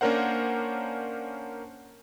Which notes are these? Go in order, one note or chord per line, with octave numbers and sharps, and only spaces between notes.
A#3 C#4 D4 A#4 C5 F#5